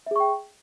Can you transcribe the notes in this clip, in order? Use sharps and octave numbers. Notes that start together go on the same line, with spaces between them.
G#4 E5 G5 C#6